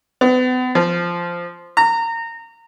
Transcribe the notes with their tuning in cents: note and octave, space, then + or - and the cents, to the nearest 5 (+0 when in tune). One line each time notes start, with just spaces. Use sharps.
B3 +40
F3 -10
A#5 -25